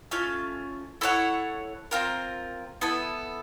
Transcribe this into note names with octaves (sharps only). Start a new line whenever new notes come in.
A3 C#4 F4
E4 A4 C#5 F#5
C4 F4 A#4
B3 E4 A4